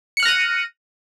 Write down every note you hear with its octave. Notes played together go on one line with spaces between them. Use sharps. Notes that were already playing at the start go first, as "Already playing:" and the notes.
F6 F#6 A#6 C#7 D#7